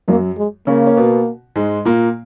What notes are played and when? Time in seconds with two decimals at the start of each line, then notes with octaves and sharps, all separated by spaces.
0.08 F#2 F#3 A#3
0.38 G#3
0.67 C#3 A#3 C#4
0.87 C#4
0.97 B2 B3
1.56 G#2 G#3
1.85 A#2 A#3